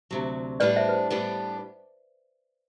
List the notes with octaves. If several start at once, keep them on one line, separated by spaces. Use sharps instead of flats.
D2 C3 F#3
A2 G3 B3 D4 G4 B4 D5
C5 E5
B4
C5
A2 G3 B3 D4 G4